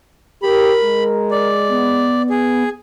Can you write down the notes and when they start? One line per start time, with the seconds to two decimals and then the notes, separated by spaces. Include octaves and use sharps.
0.43 G4 A#4 B5
0.81 G#3
1.31 D5
1.69 B3
2.30 G#4